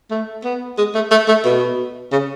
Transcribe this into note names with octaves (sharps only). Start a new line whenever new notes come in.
A3
B3
G#3
A3
A3
A3
B2
C#3